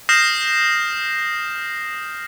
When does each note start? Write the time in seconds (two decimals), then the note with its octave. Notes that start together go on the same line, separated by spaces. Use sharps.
0.09 D#6 F6 G6 A#6 C7 E7